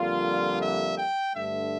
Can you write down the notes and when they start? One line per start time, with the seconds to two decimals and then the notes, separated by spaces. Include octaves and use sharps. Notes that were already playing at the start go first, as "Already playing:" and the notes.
Already playing: F2 D3 G3 A#3 F4
0.61 E5
0.97 G5
1.34 G2 D3 A3 E5